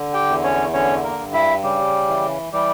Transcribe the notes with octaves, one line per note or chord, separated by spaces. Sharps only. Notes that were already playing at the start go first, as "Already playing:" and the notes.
Already playing: D3
G4 G5
E2
C#4 C#5
D3 C#4 C#5
A#3 A#4
G2
E4 E5
C#3 G3 G4
E3
E3 G3 G4